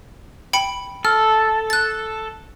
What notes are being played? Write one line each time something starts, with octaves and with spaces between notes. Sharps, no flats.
G5 B5 C#7
A4 F6
F#6 A6